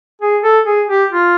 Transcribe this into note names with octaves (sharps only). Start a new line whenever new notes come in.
G#4
A4
G#4
G4
F4